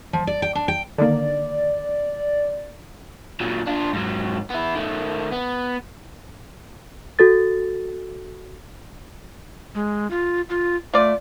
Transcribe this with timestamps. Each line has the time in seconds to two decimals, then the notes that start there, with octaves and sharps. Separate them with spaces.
0.13 F3
0.27 D5
0.42 G5
0.55 D4
0.68 G5
0.98 D3 D#3 A#3 D5
3.41 A#2 F#3
3.67 D4 F4
3.93 G#2 F#3
4.50 B3 E4
4.75 D#3 A3
5.32 B3
7.19 F#4 A4 A6
9.75 G#3
10.10 F4
10.50 F4
10.94 A3 F4 D5